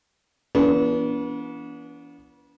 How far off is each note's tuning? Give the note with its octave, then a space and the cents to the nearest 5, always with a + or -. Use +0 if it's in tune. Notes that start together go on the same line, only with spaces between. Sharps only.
E3 +25 B3 -35 D4 -45